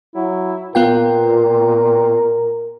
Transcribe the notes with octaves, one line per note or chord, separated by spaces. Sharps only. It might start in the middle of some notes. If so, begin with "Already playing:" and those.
F#3 E4
A#2 B3 F4 A#4 G5